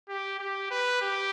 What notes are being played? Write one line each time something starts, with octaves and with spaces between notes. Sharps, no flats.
G4
G4
B4
G4